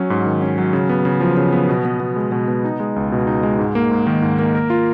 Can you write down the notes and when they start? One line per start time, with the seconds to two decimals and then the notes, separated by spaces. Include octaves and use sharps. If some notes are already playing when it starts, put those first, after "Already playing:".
Already playing: F#3 C#4
0.10 G#2
0.26 D#3
0.42 C#4
0.58 F#3
0.73 C#3
0.89 B3
1.05 C#3
1.21 F3
1.37 C#3
1.53 B3
1.69 B2
1.85 B3
2.00 B2
2.16 G#3
2.32 B2
2.48 B3
2.64 D#4
2.80 G#3
2.96 C#2
3.12 B2
3.27 D#4
3.43 G#3
3.59 G#2
3.75 A#3
3.91 G#2
4.07 D#3
4.22 G#2
4.39 A#3
4.55 A#4
4.70 F4